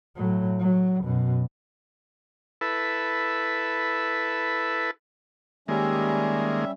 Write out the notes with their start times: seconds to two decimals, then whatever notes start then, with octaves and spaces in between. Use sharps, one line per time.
0.16 A2 F#3
0.59 F#3
1.03 F#2 B2
2.61 E4 A4 B4
5.68 D#3 G3 G#3 A#3 C#4 E5